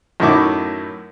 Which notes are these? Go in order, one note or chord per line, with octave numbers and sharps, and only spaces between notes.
F#2 A2 D#3 E4 C#6 D6